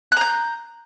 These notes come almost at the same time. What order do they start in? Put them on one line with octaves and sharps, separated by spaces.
F#6 A#5 G6